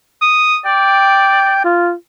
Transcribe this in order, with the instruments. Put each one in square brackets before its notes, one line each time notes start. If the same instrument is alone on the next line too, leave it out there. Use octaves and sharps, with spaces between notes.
[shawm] D#6
[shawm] D5 [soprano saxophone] G5
[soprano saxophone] F4